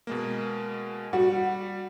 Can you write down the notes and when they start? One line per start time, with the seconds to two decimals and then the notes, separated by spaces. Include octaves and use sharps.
0.07 B2 G#3 A#3
1.13 G3 F#4